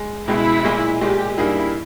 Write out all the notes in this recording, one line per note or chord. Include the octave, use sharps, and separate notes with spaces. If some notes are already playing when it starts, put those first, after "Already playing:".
Already playing: G#3
C#2 B2 G#3 E4
B1 A#2 G#3
B1 A#2 G#3 G4
G2 G3 A#3 D#4 E4 G#4